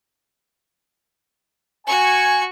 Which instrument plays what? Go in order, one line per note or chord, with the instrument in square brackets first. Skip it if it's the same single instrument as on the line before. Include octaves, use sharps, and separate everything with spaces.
[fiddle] F#4 C#6 [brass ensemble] G#5